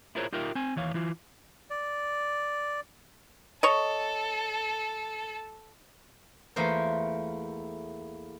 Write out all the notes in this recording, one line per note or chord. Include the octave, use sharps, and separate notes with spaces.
E4 F4 G#4 A#4 C5 C#5
D#4 F4 G4 A#4 E5
C4 G#5
D#2 E3 C#5 F5
E3 E4 F4
D5
A4 C#5 D#5
E2 A3 A#3 F4 C5